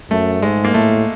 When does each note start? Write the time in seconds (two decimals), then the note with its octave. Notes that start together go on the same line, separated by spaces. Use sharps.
0.10 F#2 A3
0.42 G#2 G#3
0.65 A#3
0.74 A2 A3